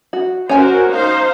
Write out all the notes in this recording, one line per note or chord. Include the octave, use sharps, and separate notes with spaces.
F#4
C#4 F#4 A#4 C5 G#5
D#4 C5 F5